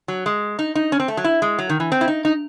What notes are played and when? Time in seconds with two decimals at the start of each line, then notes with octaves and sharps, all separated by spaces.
0.08 F#3
0.26 G#3
0.59 D#4
0.75 D#4
0.92 C#4
1.00 C4
1.08 A3
1.17 F#3
1.24 E4
1.42 G#3
1.59 F#3
1.69 D#3
1.80 E3
1.92 C4
2.01 E4
2.08 D#4
2.25 D#4